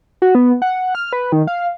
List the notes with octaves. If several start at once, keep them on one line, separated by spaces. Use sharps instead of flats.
F#4
B3
F#5
F6
B4
D#3
F5